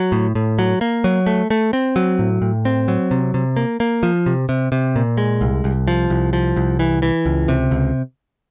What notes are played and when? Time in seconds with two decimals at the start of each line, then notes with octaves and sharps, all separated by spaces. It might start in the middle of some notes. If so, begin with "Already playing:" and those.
Already playing: F#3
0.12 A2
0.35 A2
0.59 F#3
0.81 A#3
1.04 F#3
1.27 A3
1.50 A3
1.73 C4
1.96 F#3
2.19 A2
2.42 A2
2.65 C4
2.88 F#3
3.11 C3
3.34 C3
3.57 A#3
3.80 A#3
4.03 F3
4.26 C3
4.49 C3
4.72 C3
4.96 A#2
5.18 G#3
5.41 C2
5.64 C2
5.88 F3
6.10 C2
6.33 F3
6.56 C2
6.79 E3
7.02 E3
7.26 C#2
7.48 C3
7.71 C#2